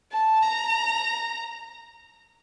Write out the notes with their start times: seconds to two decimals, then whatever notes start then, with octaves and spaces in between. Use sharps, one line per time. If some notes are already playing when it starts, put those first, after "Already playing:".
0.13 A5
0.42 A#5